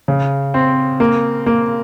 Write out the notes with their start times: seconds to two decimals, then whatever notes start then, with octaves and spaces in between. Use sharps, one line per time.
0.08 C#3
0.54 C4
1.00 A#3
1.46 A#3